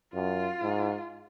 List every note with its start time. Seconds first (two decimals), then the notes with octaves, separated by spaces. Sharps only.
0.14 F#2 F4
0.62 G#2